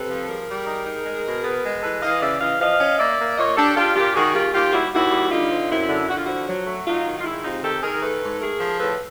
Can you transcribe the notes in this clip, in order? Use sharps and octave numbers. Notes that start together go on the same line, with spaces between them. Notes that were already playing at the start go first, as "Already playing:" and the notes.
Already playing: C3 A4 B4
F3
G3 G#4 A#4
G3
D#4
D#4
G#3
B2
B3
G#3
E3 A4 B4
E3 D#5 F5
C#3 D5 E5
E3 D#5 F5
F3 D#5 F5
C#4
A#3 D5 E5
A#3
A#2 C#5 D#5
D4 G4 A4
D4 F4 G4
A#2 F4 G4
D#3 F#4 G#4
D#2 F4 G4
D#2 F4 G4
G3 E4 F#4
D#2 E4 F#4
G3
D3 D#4 F4
C4
F#2 E4
D3
D3 F#4
F4
F3 E4 F#4
F#3
A3
F#3 D#4 F4
D#3
F4
G#3 E4
C3 D#4 F4
D#3 G4 A4
D#3 G#4 A#4
A3 A4 B4
G#2
A3 G#4 A#4
F3
A2 A4 B4